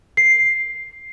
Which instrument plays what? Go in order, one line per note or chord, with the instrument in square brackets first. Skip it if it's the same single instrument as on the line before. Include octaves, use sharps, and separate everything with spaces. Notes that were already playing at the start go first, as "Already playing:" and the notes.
[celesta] C7